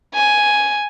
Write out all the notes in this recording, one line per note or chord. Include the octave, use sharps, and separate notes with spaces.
G#5